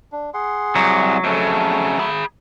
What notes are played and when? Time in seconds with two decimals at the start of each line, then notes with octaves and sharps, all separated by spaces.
0.12 D4
0.34 G#4 F#5 C6
0.76 C2 F#3
1.24 F2 C#3 A3 A4
1.99 G#4 B5